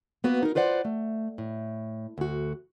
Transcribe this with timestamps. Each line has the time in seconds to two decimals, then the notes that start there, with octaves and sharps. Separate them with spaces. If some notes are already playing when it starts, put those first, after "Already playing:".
0.24 A#3 B3 F#4 B4
0.43 D#4 A#4
0.55 F4 B4 C5 D5 F#5
0.85 A3
1.38 A2
2.18 D2 F#4